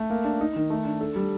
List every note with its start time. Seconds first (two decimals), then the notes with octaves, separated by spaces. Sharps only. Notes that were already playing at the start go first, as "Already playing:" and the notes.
Already playing: A3
0.10 A#3
0.24 D4
0.41 D#4
0.56 D#3
0.70 A3
0.85 D4
1.01 A4
1.16 G3